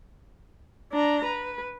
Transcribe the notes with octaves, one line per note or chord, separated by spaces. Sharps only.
D4 A#5
B4